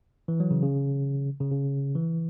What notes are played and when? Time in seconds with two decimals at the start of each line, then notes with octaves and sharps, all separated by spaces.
0.28 E3
0.40 F#3
0.51 C#3
0.62 C#3
1.40 C#3
1.51 C#3
1.95 E3